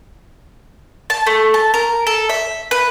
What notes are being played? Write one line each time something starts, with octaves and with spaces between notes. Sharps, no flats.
A5
A3
A5
A#4
A4
E5
B4